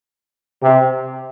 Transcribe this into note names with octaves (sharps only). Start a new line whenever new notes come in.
C3